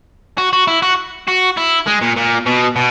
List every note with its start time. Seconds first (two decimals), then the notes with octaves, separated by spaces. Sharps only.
0.38 F#4
0.53 F#4
0.68 E4
0.82 F#4
1.28 F#4
1.57 E4
1.87 G#3
2.01 A#2
2.16 A#2
2.46 B2
2.76 B2